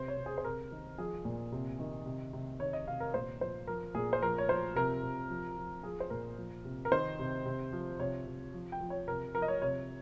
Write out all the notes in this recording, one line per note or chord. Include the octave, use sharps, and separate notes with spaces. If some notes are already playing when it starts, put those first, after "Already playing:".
Already playing: C3 C5
C#5
C3
G#4
C5
C3 A#4
D#3
F3 G#4
A#2
C3
D#3
C3
C3
D#3 C#5
D#5
C3 F5
A#4
A#2 C5
F3 C5
F3 A#4
A#2 G#4
C5
F3 A#4
C#5
F3 C5
C3 A#4
C3
F3
F3
F3 G#4
C5
A#2 A#4
F3
C3
A#4
D#3 C5
C3
C3
F3
C3 C#5
C3
F3
G5
F3
C#5
C3 A#4
F3 A#4
D#5
C#5
C3 C#5